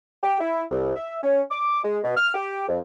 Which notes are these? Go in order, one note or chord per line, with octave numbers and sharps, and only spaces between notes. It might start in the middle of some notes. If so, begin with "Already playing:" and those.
G4
E4
C2
E5
C#4
D6
G#3
B2
F6
G4
F2